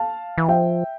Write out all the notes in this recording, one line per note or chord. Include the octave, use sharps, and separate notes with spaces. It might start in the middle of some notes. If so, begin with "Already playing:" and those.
Already playing: F5 A5
E3
F3 E5 G5